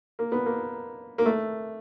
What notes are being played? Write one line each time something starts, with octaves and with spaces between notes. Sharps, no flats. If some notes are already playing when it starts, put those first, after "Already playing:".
A#3
B3
A#3
A#3
A3